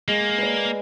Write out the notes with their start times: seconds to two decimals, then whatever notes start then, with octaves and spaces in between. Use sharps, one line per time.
0.08 G#3 A#3
0.38 B4 D5